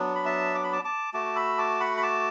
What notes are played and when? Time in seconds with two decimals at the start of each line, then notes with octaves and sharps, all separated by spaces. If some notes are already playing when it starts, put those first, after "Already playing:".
Already playing: F#3 B3 D4
0.15 B5
0.25 E5 A5
0.55 D6
0.64 B5
0.73 A5 D6
0.84 A5 D6
1.14 A3 F#4 A5 D6
1.36 B5 E6
1.58 A5 D6
1.80 F#5 B5
1.97 B5
2.03 A5 D6